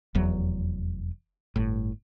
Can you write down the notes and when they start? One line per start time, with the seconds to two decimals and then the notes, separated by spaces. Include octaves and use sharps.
0.15 F1 E2 F#3
1.56 G1 A2